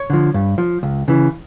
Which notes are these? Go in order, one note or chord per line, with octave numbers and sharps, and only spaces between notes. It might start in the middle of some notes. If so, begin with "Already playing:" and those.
Already playing: C#5
D3 F3
G2
F3
C#2
C#3 E3